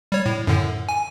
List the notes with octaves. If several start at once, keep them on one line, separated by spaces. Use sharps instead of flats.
G3 C#5
A2
F#2 A2 D3
G#5